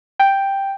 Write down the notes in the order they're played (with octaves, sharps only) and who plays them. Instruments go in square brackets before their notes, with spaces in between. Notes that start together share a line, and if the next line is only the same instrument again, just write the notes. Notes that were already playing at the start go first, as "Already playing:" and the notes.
[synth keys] G5